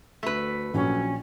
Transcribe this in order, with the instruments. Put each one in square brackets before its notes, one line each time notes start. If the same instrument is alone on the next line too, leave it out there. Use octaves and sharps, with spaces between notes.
[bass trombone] D2 [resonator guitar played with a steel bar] A3 B4
[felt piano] A#1 [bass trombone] F#3 [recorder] C#4